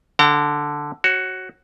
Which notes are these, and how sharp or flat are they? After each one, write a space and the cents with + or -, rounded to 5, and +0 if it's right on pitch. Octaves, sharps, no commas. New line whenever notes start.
D3 +0 G5 -45 A#5 -40
F#4 +10 C#5 -25